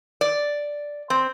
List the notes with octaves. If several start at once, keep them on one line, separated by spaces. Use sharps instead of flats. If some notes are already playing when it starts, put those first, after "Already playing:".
D5
C4